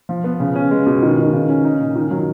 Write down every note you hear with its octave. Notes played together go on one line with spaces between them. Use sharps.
F3
B3
C#3
C#4
G#3
B2
D#3
D#3
C#3
C#4
D#4
A#2
D#3
F#3